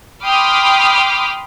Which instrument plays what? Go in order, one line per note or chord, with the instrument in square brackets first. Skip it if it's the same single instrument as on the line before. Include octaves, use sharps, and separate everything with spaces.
[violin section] G5 B5 C6 D6 D#6 F6